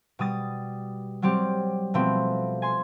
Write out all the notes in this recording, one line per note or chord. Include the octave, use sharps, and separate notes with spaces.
B2 G3 D#6 A6
F#3 G3 C4 G4
B2 F3 A3 B3 C4
G#5 C6